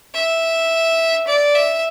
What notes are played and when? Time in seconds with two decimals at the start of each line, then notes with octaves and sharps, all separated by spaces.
0.14 E5
1.27 D5
1.55 E5